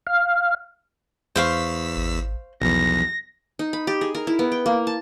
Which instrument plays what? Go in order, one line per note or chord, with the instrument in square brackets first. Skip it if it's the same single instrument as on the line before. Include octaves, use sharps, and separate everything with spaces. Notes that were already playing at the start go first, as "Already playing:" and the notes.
[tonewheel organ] F5
[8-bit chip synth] E2 E6 B6 [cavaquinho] C5 F5 C#6
[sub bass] G#1
[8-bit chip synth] B1 E2 [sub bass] F3 [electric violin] A#6
[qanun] D#4
B5
G4
G#4
A#4
E4
B3
G5
A#3
A5